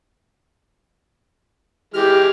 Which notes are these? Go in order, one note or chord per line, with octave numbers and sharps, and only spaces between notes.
E3 G#3 G4 F6